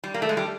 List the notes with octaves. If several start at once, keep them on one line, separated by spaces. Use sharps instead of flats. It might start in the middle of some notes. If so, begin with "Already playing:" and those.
G3
A#3
A3
G#3
G3